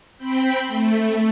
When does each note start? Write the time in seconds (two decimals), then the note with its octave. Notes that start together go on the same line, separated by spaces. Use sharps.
0.18 C4 G5 B5
0.67 A3